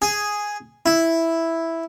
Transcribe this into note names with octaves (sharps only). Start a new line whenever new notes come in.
G#4
E4